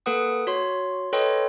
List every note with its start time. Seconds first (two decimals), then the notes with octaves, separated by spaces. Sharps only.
0.06 A#3 A4 B4 F#5 D#6
0.47 F#4 C#5 C6
1.13 A4 B4 C#5 D#5 G5 C6